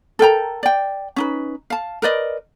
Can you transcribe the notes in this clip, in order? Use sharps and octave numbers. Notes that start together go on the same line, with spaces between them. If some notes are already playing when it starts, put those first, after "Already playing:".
A4 A#4 G5 A#5
D5 G5
C#4 D#4 B4
F5 A5
A#4 B4 D5 D#5